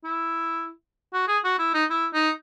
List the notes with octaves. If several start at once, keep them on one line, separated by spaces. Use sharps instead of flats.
E4
F#4
G#4
F#4
E4
D#4
E4
D#4